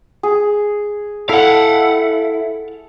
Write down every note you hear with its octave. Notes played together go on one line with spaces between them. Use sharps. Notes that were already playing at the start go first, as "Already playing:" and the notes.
G#4
E4 A4 F5 F#5